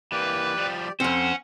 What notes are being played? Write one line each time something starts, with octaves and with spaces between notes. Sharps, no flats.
E3 A#3 G4 B4 D5
F3 G3
F2 C4 C#4 C5 F#5